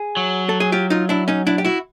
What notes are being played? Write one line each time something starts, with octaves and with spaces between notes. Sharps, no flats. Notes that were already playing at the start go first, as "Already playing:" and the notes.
Already playing: G#4
F#3
A4
G#4
F4 G4
D#4 F4
D4 E4
C#4 D#4
D4 E4
G4
E4 F#4